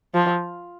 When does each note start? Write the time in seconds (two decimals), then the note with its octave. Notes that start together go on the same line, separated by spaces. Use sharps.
0.14 F3